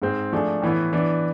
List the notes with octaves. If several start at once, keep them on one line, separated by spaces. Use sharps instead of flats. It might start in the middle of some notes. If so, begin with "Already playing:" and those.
G#2 G#3 C4
F3 A3 D4 G#4
A2 E3 B3
E3 B3 D4